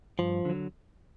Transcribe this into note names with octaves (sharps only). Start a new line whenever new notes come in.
G2 F3
D3 F#3